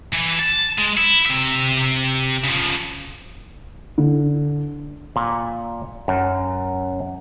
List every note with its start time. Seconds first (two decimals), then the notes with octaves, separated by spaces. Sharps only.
0.13 E3
0.39 A5
0.78 G#3
0.97 E4
1.26 C3 E5
2.44 C#3 F3
3.98 D3
5.16 A#2
6.08 F#2